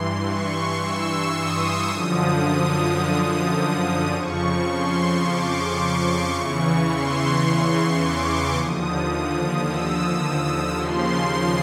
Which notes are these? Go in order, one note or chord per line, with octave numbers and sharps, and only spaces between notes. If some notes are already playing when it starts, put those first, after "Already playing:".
Already playing: G2 E3 C6
C#6
E6
D#6
F#2 D3 F3
D#6
F2 C#3 F3 C#6
C6
D6
C#6
E2 C#3 E3
C6
C6
D6
D#2 D3 F3 D#6
E6
D#2 C#3 F3 C6